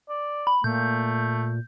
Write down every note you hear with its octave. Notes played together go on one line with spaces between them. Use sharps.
D5
B5
A#2 A3 G6